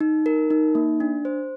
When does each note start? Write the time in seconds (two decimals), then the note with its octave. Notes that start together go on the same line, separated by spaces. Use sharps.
0.01 D#4
0.26 A#4
0.50 D#4
0.75 A#3
1.00 D4
1.25 C5